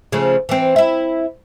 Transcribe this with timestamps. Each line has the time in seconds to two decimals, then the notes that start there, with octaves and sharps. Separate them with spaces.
0.12 C#3 F3 A3
0.49 E3 C4
0.76 E4 E5